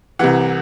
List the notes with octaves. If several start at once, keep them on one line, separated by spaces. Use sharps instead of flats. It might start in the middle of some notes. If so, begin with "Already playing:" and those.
C2 C3 E3 F#5